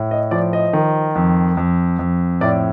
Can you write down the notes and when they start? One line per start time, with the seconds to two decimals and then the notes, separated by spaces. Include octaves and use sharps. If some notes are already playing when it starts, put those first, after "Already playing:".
Already playing: A2
0.11 D#5
0.31 F3 D5
0.53 D#5
0.73 D#3
1.15 F2
1.57 F2
1.99 F2
2.41 A2 D5